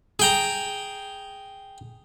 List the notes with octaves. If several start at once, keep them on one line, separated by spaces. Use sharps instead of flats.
G#4 G5 A#5